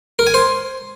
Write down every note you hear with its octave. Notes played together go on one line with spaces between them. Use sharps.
A#4
G#5
C5